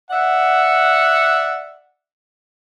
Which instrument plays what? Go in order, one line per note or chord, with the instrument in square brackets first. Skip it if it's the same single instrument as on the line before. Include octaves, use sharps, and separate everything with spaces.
[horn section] D5 E5 F#5